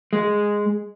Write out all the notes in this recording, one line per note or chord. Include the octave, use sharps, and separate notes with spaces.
G#3